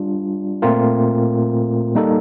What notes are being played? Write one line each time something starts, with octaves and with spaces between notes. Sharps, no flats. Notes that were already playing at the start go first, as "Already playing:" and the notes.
Already playing: G3 D4 F4
A#2 A3 C4 F4 A#4
G3 A#3 D#4 A4